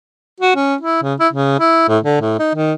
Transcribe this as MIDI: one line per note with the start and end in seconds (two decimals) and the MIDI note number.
0.40 0.55 66
0.56 0.75 61
0.81 1.02 64
1.02 1.14 49
1.20 1.28 64
1.33 1.56 49
1.59 1.85 64
1.88 1.98 45
2.03 2.19 50
2.21 2.36 45
2.39 2.52 63
2.55 2.73 51